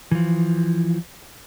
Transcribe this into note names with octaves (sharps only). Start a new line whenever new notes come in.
E3 F3